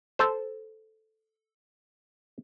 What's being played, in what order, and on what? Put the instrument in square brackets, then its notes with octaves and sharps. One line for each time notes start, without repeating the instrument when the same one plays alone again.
[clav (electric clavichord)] A4 C5